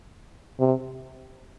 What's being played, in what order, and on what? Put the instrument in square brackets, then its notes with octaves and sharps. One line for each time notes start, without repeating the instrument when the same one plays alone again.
[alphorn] C3